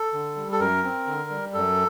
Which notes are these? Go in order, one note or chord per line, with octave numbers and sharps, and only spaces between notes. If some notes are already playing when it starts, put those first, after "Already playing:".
Already playing: A4
D3
G3
A4
F#2 A#4
C4
D3
G3
F#2 A4